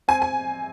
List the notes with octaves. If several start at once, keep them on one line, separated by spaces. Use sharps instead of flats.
C4 G#5
G#5